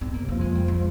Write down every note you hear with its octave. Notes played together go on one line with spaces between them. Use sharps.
G#2 C4
A#3
C3
F2 F3 A#3
G#3
G3
G#3